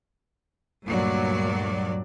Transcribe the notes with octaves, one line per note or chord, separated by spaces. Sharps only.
D2 G2 A#2 F#3 D5